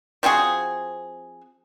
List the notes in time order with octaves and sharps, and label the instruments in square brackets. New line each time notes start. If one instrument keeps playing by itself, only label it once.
[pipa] F3 C4 F#4 G#4